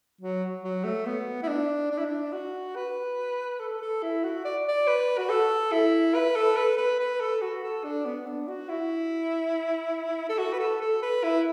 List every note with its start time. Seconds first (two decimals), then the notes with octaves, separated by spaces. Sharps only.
0.21 F#3
0.64 F#3
0.84 A3
1.06 B3
1.43 E4
1.48 D4
1.91 D4
1.98 E4
2.05 D4
2.33 F#4
2.76 B4
3.60 A4
3.82 A4
4.03 E4
4.24 F#4
4.45 D5
4.68 D5
4.88 B4
5.18 F#4
5.30 A4
5.72 E4
6.15 B4
6.36 A4
6.57 B4
6.78 B4
6.99 B4
7.21 A4
7.42 F#4
7.63 A4
7.84 D4
8.05 B3
8.26 D4
8.48 F#4
8.69 E4
10.29 A4
10.38 F#4
10.53 B4
10.60 A4
10.81 A4
11.02 B4
11.24 E4